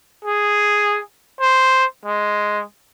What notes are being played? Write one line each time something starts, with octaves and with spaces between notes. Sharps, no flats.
G#4
C5
G#3